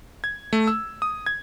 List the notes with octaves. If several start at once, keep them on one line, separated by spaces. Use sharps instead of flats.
G#6
A3
E6
D#6
G#6